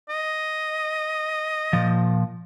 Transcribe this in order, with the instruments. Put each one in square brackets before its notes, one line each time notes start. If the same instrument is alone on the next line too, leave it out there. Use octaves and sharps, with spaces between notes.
[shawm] D#5
[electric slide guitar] A#2 F3